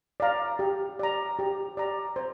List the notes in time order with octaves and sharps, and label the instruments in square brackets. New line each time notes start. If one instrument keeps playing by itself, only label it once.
[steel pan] D5 F5 A#5
G4
D5 A#5
G4
D5 A#5
C5